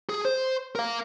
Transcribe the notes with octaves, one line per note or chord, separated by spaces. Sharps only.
G#4
C5
A#4 F5